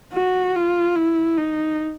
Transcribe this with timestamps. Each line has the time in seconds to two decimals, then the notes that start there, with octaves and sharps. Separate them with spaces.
0.13 F#4
0.55 F4
0.96 E4
1.37 D#4